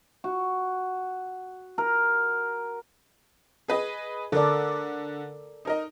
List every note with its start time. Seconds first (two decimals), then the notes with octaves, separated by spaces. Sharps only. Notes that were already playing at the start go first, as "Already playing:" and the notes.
0.24 F#4
1.78 A#4
3.68 G#4 B4 D#5
4.32 D3 A4 A#4 D5
5.65 D#4 A#4 D#5